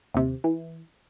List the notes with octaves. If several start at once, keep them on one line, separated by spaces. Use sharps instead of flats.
D#2 C3
E3